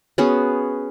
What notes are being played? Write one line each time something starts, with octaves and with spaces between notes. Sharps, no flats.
B3 C#4 F#4 G#4